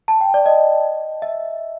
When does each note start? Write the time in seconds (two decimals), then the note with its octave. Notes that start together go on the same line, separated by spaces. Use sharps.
0.08 A5
0.21 G5
0.34 D5
0.46 D#5
1.22 E5